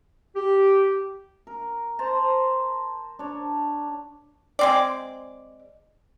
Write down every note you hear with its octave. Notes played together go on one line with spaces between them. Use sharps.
G4
A#4
C5 A5 A#5
D4 C#5
G#3 C4 D5